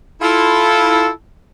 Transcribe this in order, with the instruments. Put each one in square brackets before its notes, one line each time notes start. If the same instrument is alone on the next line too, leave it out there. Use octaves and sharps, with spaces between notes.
[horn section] E4 F4 A4